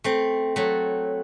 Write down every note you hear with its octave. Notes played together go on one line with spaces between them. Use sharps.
A3 C4
F#3 A3